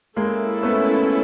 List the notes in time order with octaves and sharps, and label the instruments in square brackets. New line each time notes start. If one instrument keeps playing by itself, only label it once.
[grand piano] G#3 A#3 [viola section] C#4 E4 A4
[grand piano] A3 B3